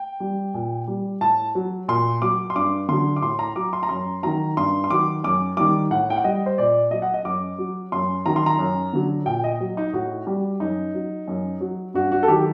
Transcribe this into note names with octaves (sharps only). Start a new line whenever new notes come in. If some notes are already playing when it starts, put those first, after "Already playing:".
Already playing: G5
G3
A#2
G3
A2 A5
F#3
A#2 C6
F#3 D6
C6
G2 D6
D3 F#3 C6
D6
A2 C6
A#5
F#3 D6
C6
A#5
F#2 C6
D#3 F#3 A#5
G2 C6
C6
D#3 F#3 D6
F#2 D6
D#3 G3 D6
A2 F#5
G5
F#5
G3 D#5
C5
A#2 D5
F#3 D#5
F#5
D#5
F#2 D6
F#3
F#2 C6
D#3 F#3 A#5
C6
A#5
F#2
D3 F#3
A#2 G5
D#5
F#3
D#4
A2 F#4
G3
F#2 D#4
F#3
F#2
F#3
G2 F#4
F#4
A4
D#3 F#3 G4